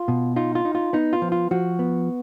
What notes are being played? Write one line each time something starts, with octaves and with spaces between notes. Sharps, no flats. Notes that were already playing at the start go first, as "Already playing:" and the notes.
Already playing: F4
B2
D#4 F4
F4
D#4
F4
B3 D#4
F4
F3
F4
F3 F#4
B3